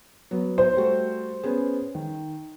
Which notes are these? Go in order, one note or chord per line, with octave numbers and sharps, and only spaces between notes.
F#3 B3
C5
G3 A3 F#4
B3 C#4 G#4
D#3